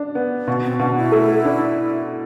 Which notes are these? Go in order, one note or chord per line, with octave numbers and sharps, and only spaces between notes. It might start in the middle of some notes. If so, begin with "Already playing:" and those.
Already playing: D4
B3
B2
C4
B2 D4
E4
A3
D4